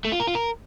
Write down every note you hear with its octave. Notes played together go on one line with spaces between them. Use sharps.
A3
F4
A#4
F4
A#4